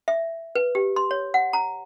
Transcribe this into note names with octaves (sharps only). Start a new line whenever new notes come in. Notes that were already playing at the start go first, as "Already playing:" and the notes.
E5
B4
G4
C6
C#5
F#5
A#5